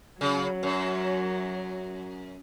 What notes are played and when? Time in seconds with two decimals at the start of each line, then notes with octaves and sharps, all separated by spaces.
0.21 C#3 F#3
0.63 F#2